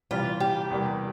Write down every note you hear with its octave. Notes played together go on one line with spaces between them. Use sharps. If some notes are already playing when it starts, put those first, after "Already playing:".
C3 E3 G3 F4
G4
E2 C3 G3 A#3